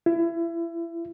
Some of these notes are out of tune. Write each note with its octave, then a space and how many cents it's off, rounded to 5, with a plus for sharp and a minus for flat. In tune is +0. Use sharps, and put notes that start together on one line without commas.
E4 +30